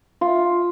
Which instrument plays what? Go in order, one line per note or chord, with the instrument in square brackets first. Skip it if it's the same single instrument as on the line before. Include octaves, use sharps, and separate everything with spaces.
[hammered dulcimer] F4